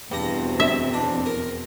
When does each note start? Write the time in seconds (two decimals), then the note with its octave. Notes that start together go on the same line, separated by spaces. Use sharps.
0.11 E2 G2 B2 C4 A#5
0.60 E5
0.94 D4
1.26 A#4